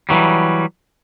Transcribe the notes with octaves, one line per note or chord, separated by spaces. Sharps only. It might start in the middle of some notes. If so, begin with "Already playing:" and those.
E3 F#3 G3